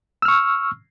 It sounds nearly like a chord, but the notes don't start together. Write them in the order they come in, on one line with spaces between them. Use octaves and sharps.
E6 F6 C#6